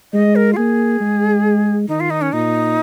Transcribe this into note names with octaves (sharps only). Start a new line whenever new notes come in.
G#3 D#5
A#4
F4
A#3 G#4
G#3
D#3 D#4
F4
D#4
C#4
A#2 D#4